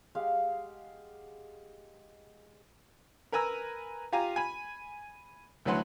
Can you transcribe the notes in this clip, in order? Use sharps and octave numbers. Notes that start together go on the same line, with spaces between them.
G#3 G4 F5 F#5
A#4 B4 G#5 A#5 E6
F4 G4 F5 G#5 A#5
G#5 B5
D2 E3 F#3 B4 F#5 C6